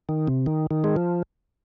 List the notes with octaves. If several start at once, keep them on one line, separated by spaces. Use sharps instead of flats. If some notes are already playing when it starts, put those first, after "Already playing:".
D#3
C3
D#3
D#3
G#3
F3